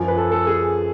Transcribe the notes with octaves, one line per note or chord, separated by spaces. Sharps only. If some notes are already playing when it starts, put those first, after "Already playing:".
Already playing: F#2 F3
B4
A4
A4
G#4